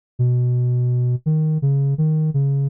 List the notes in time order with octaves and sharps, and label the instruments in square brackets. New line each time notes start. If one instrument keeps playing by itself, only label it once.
[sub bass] B2
D#3
C#3
D#3
C#3